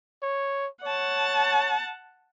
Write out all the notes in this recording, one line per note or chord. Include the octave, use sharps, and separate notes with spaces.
C#5
C#5 F#5 A5